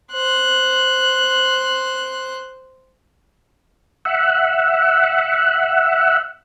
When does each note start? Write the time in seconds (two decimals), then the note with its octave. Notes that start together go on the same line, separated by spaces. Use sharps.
0.12 C5 F#6
4.05 E5 F#5